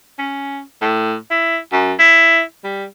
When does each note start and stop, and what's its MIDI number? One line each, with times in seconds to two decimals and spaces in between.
0.19 0.61 61
0.81 1.15 45
1.31 1.58 64
1.73 1.93 42
1.99 2.41 64
2.64 2.85 55